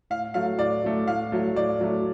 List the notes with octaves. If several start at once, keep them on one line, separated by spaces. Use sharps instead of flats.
A2 F5
F#3 A3 F5
A2 D5
F#3 A3
A2 F5
F#3 A3
A2 D5
F#3 A3